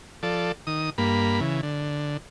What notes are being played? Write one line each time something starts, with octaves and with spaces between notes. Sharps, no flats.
F3 A4 D5
D#3 D#6
G2 A#3 B5
C#3 E3
D3